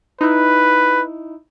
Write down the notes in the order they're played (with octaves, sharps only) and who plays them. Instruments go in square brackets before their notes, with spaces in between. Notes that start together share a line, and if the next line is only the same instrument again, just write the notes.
[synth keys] D#4 E4 [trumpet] B4